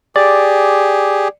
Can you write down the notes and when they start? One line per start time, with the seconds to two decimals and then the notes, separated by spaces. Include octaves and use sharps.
0.16 G4 G#4 D5